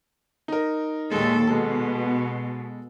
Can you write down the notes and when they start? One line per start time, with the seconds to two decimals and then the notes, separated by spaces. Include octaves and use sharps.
0.48 D#4 A#4
1.11 D#2 A#2 G#3 A4
1.47 B2 G#3 A4